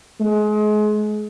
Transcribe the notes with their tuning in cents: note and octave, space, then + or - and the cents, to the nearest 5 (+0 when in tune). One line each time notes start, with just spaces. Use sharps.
G#3 +30